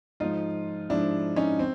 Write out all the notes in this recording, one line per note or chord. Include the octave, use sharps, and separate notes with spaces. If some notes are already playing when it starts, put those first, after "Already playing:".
G#2 F3 D#4 F4
G#2 F3 D4 E4
C#4 D#4
C4